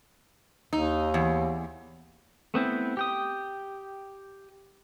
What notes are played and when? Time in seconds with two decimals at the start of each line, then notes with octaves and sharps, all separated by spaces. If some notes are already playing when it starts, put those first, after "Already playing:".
0.73 D#2 D#4
1.14 E2
2.54 A3 B3 C4 E4
2.97 G4 G5 D#6